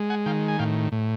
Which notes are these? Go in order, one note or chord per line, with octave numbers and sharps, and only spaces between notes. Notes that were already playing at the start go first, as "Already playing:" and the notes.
Already playing: G#3
F#5 G#5
D#3 F5 G5
G#5
A2 F5 G5
A2